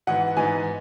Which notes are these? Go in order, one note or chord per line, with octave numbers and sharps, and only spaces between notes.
G#2 E3 B3 F#5
G#2 E3 B3 D#4 G#5